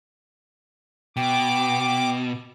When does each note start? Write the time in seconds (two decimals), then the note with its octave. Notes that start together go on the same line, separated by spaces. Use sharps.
1.17 B2 G5 D6